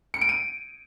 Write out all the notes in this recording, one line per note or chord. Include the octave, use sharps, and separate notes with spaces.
C#7
D7
D#7